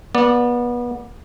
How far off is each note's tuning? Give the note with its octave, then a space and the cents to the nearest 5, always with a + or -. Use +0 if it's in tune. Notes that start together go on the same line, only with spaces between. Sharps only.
B3 -30 D5 +5